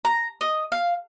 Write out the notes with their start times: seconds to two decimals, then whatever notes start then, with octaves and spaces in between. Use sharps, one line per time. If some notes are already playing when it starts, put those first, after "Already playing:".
0.05 A#5
0.41 D#5
0.72 F5